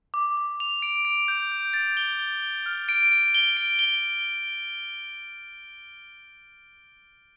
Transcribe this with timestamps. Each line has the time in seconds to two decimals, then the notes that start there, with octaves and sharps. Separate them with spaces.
0.14 D6
0.37 D6
0.60 F7
0.82 D7
1.05 D7
1.28 G6
1.52 G6
1.74 A6
1.97 G7
2.19 G7
2.43 G7
2.66 F6
2.89 D7
3.11 D7
3.35 G7
3.57 D7
3.79 G7